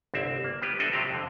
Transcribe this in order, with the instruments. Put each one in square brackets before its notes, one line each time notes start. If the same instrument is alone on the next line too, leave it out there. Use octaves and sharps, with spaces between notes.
[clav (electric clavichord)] G1 C2 C4 E5
A#3
G3 B3 G4 B4
C4 D4 A4 D#5 E5 F#5
C3 F#3 G3 C4 F4 G4
F2 D3